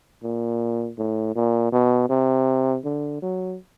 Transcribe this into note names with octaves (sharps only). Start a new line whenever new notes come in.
A#2
A2
A#2
B2
C3
D3
F#3